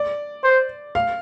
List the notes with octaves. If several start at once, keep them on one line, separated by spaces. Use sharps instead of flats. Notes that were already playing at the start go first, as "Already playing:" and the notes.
Already playing: D5
C5
F5